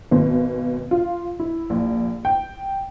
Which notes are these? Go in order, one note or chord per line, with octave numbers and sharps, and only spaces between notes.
G#1 B2
F4
E4
A#1
G5